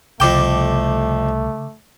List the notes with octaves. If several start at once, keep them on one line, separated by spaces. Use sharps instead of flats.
C2 F2 C#3 A3 A4 G5 D6